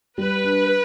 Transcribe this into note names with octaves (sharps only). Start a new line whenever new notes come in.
G3 B4
D4